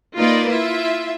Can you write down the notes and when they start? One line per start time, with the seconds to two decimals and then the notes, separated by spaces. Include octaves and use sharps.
0.17 A#3 D#4 F4 A#4 B4 D5
0.49 E4 F4 E5